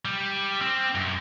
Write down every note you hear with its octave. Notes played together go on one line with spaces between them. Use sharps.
G3
C4
F#2